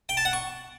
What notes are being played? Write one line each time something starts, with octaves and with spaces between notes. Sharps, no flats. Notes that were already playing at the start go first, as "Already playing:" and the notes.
G5
A5
F#5
C#6